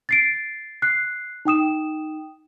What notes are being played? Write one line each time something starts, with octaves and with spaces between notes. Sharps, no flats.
A6 C7 D7
F#6 C7
D#4 G5 D#6 E7